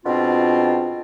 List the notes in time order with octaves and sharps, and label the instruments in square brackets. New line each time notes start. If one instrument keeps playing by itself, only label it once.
[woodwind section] G#2 B2 C4 D4 F4